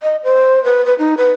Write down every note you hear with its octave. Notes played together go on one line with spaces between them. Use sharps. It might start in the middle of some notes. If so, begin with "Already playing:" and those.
D#5
C5
B4
B4
D#4
B4